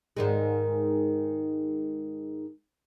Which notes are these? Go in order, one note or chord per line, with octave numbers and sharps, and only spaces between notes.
G#2 D#3 G#3